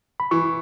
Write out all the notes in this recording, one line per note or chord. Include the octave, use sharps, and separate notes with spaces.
B5
E3 C#6